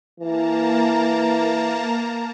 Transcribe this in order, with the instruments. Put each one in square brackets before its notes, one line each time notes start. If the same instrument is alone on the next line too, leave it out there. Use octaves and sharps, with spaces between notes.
[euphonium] E3 [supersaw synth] A#3 A5 A#5